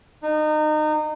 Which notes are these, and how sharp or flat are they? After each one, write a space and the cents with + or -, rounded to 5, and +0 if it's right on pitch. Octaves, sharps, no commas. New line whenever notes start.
D#4 -25